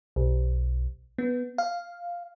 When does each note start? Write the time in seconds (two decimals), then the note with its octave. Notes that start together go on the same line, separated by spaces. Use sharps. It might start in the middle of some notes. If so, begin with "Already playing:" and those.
0.16 B1
1.18 B3
1.58 F5